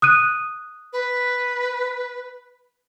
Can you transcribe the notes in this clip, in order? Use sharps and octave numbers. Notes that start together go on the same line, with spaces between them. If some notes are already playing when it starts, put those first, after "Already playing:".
D#6 F#6 D#7
B4